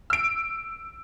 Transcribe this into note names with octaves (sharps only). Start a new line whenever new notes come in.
E6 D7